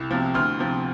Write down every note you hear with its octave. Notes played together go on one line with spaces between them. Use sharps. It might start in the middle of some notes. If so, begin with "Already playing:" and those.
Already playing: C2
C3 F3
D2 C6 F6
C3 F3